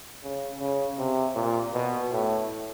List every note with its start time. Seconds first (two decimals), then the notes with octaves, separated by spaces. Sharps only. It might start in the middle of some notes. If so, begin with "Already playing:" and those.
0.23 C#3
0.60 C#3
0.98 C3
1.35 A#2
1.74 B2
2.11 A2